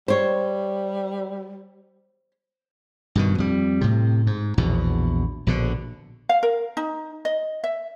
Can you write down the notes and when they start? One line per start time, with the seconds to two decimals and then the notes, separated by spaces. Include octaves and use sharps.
0.08 G3 C5 C#5
3.15 G2 B2 D#3
3.38 F2 G3
3.81 A2 C3
4.27 G#2
4.57 A#1 E2 B2
5.47 A#1 B2 D3
6.29 F5
6.43 A#4
6.77 D#4
7.25 D#5
7.64 E5